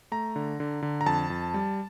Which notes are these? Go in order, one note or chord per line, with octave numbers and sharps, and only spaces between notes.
A3 A#5
D3
D3
D3
A#5
F2 A5
F2
G3